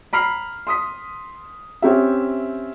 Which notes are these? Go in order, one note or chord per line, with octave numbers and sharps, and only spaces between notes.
A#5 B5 F6 C7
C6 D#6 B6
C4 C#4 G4 E5